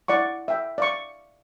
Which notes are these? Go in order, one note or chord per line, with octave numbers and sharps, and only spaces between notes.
E4 D5 F#5 C#6
E5 G5
D5 F5 C#6